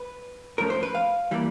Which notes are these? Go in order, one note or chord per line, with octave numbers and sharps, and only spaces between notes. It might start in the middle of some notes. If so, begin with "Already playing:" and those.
Already playing: B4
G#2 F3 A3 C#4 A#4
C5
B4
F5
E3 G3 A#3